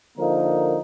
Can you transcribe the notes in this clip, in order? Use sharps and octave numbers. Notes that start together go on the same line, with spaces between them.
D3 F3 A#3 D#4 A#4